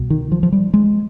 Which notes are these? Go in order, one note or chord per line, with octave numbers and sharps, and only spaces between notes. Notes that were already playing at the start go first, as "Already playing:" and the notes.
Already playing: C2 B2
D#3
F3
F3
G3
G#3